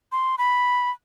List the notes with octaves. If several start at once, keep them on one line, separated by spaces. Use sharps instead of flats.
C6
B5